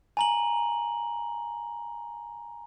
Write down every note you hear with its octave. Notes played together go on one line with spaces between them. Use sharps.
G#5 A#5 F#7